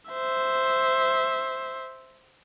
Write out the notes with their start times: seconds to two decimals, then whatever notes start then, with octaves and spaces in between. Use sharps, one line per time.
0.11 C5 E5